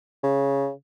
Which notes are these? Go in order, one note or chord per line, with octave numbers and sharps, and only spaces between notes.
C#3